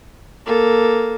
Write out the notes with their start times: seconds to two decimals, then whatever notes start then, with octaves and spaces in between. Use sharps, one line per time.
0.47 A#3 A4